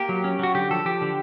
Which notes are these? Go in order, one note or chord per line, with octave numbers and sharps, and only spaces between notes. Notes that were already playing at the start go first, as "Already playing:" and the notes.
Already playing: A#3 G4
F#3
C#4
F#3 F#4
D3 G4
F3 A4
F3 G4
D3